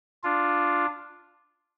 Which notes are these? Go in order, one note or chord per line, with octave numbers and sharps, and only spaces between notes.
D4 F4